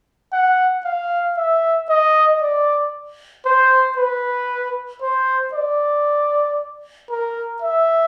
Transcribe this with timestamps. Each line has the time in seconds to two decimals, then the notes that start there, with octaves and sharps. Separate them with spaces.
0.32 F#5
0.84 F5
1.37 E5
1.89 D#5
2.41 D5
3.45 C5
3.97 B4
5.02 C5
5.53 D5
7.10 A#4
7.62 E5